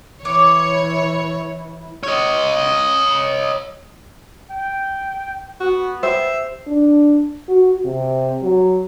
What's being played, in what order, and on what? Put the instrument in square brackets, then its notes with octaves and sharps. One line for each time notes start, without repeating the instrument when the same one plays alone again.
[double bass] E3 E4 [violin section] C#5 [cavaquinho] D6
[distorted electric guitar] C#5 D#5
[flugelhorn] G5
[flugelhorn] B3 [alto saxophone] F#4
[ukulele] G4 C5 [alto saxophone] E5
[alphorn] D4
F#4
C3
F#3